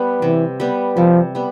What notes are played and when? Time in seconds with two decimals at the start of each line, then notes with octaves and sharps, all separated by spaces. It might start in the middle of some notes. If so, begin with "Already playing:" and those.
Already playing: G3 B3
0.22 C3 E3
0.60 G3 B3
0.97 C3 F3
1.35 G3 B3